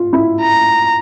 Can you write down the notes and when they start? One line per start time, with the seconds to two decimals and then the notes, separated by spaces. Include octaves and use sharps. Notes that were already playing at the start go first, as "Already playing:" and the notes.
Already playing: F4
0.13 E4
0.41 A#5